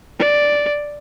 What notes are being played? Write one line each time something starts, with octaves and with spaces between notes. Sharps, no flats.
D5